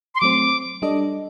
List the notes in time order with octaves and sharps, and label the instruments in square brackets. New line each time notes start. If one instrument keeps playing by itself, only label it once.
[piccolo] C6
[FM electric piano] F#3 A3 C4 [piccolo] D6
[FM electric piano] G3 D4 A4 D#5